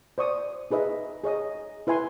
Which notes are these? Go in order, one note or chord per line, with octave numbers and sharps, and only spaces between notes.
C5 D5 C#6 D#6
D#4 G#4 B4 D#5 E5
G#4 C#5 D#5 D#6
E4 B4 E5 G#5 C6